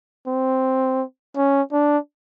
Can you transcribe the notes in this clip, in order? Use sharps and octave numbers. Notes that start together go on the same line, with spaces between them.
C4
C#4
D4